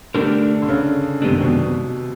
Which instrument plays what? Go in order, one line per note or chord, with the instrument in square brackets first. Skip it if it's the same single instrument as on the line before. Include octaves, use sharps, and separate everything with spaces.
[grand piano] D3 [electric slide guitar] A3 D4 G4 A#4
[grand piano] D3
C#3
[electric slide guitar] F#2 D#3 G#3 B3 D4 [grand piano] C3
[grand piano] B2